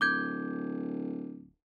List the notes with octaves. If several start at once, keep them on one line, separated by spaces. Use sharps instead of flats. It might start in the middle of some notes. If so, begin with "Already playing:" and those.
D1 D6 G6 G#6